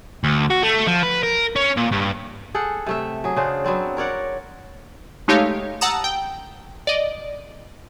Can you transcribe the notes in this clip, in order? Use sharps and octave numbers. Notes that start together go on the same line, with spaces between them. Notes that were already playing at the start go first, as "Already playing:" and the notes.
D2
F#4
A3
F3
B4
A#4
C#4
A#2
G2
G#4 A4 F#5 G5
C3 A3 E5
F#3 G#4
C#3 D4 C5
F#3 B3 C4 D5
A#4 C#5 D5 F#5
G#3 A3 D#4 G4 C#5 F5
F#5 A5 A#5 D#6 E6
G5
D5 D#5